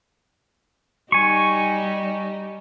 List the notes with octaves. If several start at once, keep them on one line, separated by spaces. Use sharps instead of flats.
G3 D#4 G#5 C#6